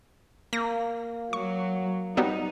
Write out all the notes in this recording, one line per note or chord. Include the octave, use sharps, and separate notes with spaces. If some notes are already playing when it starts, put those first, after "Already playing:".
A#3 A#6
F#3 C#6
F#3 G3 B3 D#4